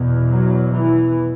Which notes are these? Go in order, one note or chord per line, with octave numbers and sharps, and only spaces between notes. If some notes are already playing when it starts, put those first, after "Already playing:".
Already playing: E2 B2
F#3
E3